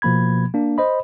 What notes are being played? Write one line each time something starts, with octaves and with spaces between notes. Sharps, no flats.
B2 F3 A#3 B5 G#6
A#3 D4
C5 D#5 B5